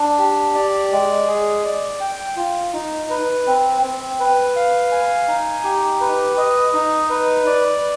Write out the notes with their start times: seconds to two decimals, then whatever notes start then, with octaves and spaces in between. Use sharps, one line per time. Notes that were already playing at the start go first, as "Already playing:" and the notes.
Already playing: D4
0.19 G4
0.55 D5
0.92 G#3
1.27 G#4
1.65 D5
2.01 G5
2.36 F4
2.73 D#4
3.10 B4
3.47 C4
3.82 C4
4.20 B4
4.56 F5
4.92 G#5
5.28 D#4
5.64 G4
6.01 B4
6.37 D#5
6.74 D#4
7.10 B4
7.46 D5